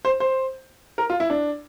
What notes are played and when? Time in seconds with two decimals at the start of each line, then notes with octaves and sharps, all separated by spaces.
0.05 C5
0.20 C5
0.98 A#4
1.10 F4
1.20 E4
1.30 D4